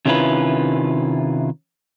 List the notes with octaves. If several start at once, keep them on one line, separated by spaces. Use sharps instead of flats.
C3 D#3 C#4 E4 F4 B4